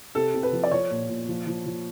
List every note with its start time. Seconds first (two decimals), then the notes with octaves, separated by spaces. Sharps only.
0.15 C3 A4
0.34 C3
0.43 B4
0.52 F3
0.64 D5
0.72 F3 C#5
0.91 A#2
1.09 A#2
1.28 F3
1.47 F3
1.66 F3